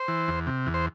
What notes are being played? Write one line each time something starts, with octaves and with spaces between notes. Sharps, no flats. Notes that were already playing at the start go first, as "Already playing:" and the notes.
Already playing: C5
E3
E2
C3
E2
C5